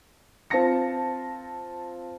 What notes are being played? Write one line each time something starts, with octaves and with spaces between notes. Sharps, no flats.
C4 F4 F5 A5 A#6 C#7